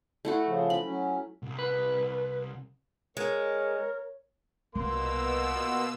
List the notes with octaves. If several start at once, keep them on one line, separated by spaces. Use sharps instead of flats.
A3 E4 F#4
C#3 F3
B5
F#3 C#4
C2
B4
G#3 A#4 C#5
C2 B2 A#3 B3 C6 E6